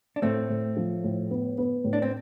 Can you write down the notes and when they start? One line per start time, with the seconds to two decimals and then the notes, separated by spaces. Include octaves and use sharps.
0.16 D4
0.22 A2 A3 C4
0.50 A2
0.77 F3
1.04 A2
1.31 B3
1.58 B3
1.84 A2
1.93 D4
2.02 C4